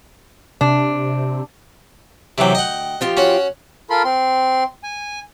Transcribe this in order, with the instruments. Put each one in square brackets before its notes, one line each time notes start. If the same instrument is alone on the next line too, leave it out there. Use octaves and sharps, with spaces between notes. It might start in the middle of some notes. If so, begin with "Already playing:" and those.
[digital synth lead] C3 [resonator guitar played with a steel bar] D4
[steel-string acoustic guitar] D2 G5 [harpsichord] C3 E3 F#3
[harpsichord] D#5 F#5
[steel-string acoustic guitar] F3 F4 G4
[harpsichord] C#4 F#4 C#5
[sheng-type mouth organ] F4 A4 A#4 B5 C6
C4 C6
G#5